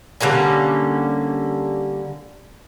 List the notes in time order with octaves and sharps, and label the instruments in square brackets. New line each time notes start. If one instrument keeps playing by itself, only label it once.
[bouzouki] D3 G3 A#3 C#4